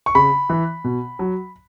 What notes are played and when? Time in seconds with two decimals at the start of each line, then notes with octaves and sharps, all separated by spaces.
0.06 C#6
0.15 C#3 B5
0.50 E3
0.84 B2
1.19 F#3